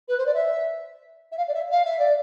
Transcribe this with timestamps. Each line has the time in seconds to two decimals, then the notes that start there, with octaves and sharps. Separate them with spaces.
0.08 B4
0.17 C5
0.25 D5
0.33 E5
1.31 E5
1.37 F5
1.47 D5
1.53 E5
1.70 F5
1.84 E5
1.98 D5